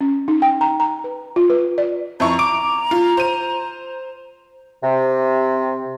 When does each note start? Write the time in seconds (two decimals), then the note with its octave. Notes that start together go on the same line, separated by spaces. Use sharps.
0.01 C#4
0.28 D#4
0.42 G5
0.61 A#5
0.80 A#5
1.04 B4
1.36 F4
1.50 B4
1.78 D5
2.20 F2 E4 A#5 C#6
2.39 D6 D7
2.91 F4
3.17 C5 D#7
4.82 C3